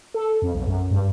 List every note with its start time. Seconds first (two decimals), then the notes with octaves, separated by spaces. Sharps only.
0.14 A4
0.42 F2
0.54 B1
0.67 F#2
0.90 G2